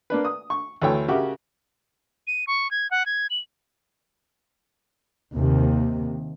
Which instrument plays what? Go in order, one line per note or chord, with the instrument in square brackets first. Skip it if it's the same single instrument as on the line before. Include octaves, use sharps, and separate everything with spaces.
[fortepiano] A#3 D4 B4
D#6
C#6
D2 E3 A3 C#5 G5
C#3 F#4 G4 A#4 E5
[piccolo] D#7
C#6
G#6
F#5
G#6
F#7
[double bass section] D#2 C3